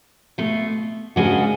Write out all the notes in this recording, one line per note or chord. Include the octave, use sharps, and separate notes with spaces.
B2 A3 F4
C#3 F3 G#3 D4 F#4